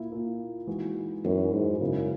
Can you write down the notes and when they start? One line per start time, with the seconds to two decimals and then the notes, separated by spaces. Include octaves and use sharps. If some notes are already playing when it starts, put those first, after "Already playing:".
Already playing: A#2 A#3 E4
0.10 A#2 A#3 E4
0.67 E3 G#3 D#4 F#4
1.24 F#2 E3 G#3 D#4 F#4
1.53 G#2
1.81 F#2 C#3 G#3 B3 E4